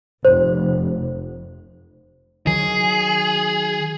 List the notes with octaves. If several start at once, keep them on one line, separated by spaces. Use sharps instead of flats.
F1 C5
D#3 F#3 G#4